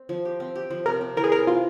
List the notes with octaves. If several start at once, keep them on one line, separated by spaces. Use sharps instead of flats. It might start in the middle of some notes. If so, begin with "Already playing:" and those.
Already playing: C4
F3
G4
C4
G4
F3
C3 A#4
C3
E3 A#4
G#4
C3 A#4
C3 F4